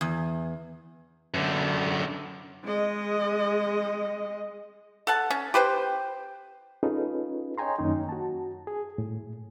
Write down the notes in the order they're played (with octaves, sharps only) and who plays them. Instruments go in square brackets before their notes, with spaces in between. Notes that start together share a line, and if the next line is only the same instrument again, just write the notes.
[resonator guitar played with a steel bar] E2
[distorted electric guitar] F#2 D3
[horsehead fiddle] G#3 D#5
[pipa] A4 F#5 A5
C#4
G4 B4 C5 G5
[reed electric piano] C#4 D#4 F4 G#4 A4 B4
C#5 D#5 G5 G#5 A#5 C6
F#2 D#3 A#3 C#4 D#4
F#4 A5
G#4
A2